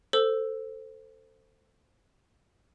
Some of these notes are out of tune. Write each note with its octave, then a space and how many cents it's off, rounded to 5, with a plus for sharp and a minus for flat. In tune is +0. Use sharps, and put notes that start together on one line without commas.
A4 +20 C5 +0 E6 +0